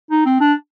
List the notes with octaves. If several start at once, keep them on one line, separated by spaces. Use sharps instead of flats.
D#4
C4
D4